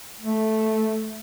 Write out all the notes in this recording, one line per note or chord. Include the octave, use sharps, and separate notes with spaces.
A3